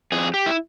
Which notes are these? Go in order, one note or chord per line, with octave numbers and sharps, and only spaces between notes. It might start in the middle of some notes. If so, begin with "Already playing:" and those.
F2 G#4
G4
E4